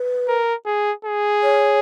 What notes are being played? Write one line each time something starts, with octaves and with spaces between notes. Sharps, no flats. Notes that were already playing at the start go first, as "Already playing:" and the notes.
Already playing: B4
A#4
G#4
G#4
C#5